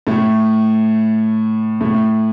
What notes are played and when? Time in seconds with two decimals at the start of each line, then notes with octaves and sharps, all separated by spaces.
0.07 A2 A3
1.81 A2 A3